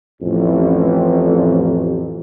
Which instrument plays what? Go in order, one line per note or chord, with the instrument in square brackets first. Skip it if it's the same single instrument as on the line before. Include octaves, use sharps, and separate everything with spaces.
[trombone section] A1 [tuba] F2